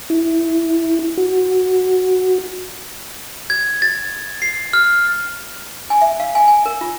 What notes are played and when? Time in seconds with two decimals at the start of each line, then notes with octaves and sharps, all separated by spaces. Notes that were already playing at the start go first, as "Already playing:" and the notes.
0.10 E4
1.18 F#4
3.50 G#6
3.82 A6
4.42 C7
4.73 F6
5.90 G#5
6.02 E5
6.20 F5
6.35 G#5
6.48 G#5
6.66 A#4
6.81 F4